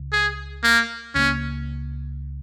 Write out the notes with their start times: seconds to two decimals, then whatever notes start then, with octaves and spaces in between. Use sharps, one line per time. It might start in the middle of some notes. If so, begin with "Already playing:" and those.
Already playing: C#2 C#3
0.12 G#4
0.64 A#3
1.15 C#2 C#3 A#3 C#4